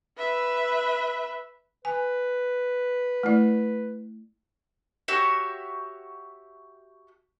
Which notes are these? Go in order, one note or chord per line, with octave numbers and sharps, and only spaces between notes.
B4 E5
B4 G#5
A3 E4 D5
F#4 G4 C#5 E5